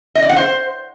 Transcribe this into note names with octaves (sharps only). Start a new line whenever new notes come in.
D#5
D5
F#5
C5